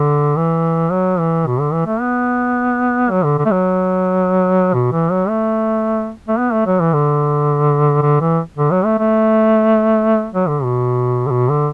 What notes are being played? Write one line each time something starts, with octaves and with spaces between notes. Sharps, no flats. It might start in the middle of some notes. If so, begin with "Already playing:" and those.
Already playing: D3
E3
F#3
E3
B2
D3
E3
A3
B3
F#3
D3
D3
A3
F#3
B2
E3
F#3
A3
A3
B3
A3
F#3
E3
D3
D3
E3
D3
F#3
A3
A3
F#3
D3
B2
D3
B2
D3